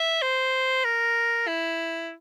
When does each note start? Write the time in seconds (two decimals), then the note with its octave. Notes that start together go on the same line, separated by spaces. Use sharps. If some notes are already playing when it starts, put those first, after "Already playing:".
Already playing: E5
0.22 C5
0.85 A#4
1.47 E4